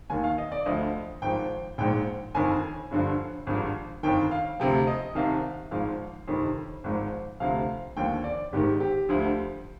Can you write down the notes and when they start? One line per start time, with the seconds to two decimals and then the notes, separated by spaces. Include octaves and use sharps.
0.10 D#2 D#3 G#5
0.24 F5
0.38 D#5
0.52 D5
0.66 D2 D3 F3 D#5
1.22 G#1 G#2 F3 G5
1.78 A#1 G#2 F3 G5
2.34 G1 F2 D#3 G#5
2.91 G1 G2 D3 F3
3.47 G#1 G2 F3
4.03 G1 F2 D#3 G5
4.31 F5
4.60 D2 C3 F3 G5
4.87 D#5
5.15 C2 C3 D#3 F5
5.71 G#1 G#2 F3 F5
6.28 G1 F2 C3 D#3
6.84 G#1 G#2 F3
7.40 D2 C3 F3 F5
7.96 D#2 D3 F3 G5
8.24 D5
8.52 G#1 G#2 D#3 G4
8.80 G4
9.09 D2 D3 F3